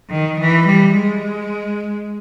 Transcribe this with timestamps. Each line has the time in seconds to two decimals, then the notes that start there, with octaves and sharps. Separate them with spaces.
0.10 D#3
0.39 E3
0.66 G3
0.95 G#3